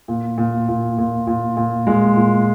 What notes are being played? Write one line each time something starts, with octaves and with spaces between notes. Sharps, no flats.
A#2
A#2
A#2
A#2
A#2
A#2
A#2 G#3
A#2